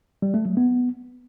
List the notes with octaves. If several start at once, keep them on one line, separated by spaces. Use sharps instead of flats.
G3
A3
F#3
B3